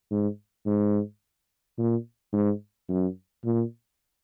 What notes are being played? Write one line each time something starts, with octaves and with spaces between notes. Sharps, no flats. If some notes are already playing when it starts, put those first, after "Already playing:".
G#2
G#2
A#2
G#2
F#2
A#2